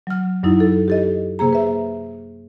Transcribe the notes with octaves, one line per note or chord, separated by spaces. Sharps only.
F#3 F6
F#2 F#3 D#4 E4
A4
G4 A4 D#5
C3 A#3 G#4 A#5
B4 E5